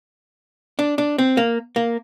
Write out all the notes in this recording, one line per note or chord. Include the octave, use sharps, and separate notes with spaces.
D4
D4
C4
A#3
A#3